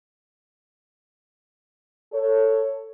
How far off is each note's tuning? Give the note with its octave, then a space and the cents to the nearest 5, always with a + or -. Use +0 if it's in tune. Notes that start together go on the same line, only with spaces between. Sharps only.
A4 +15 C#5 +0